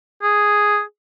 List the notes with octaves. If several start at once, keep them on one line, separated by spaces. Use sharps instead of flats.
G#4